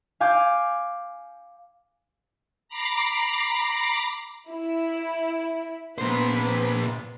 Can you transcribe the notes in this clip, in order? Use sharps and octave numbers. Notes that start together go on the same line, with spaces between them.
F5 G#5 D6 G6
A#5 B5 D6 C7
E4
A#2 B3 C4 B4 C5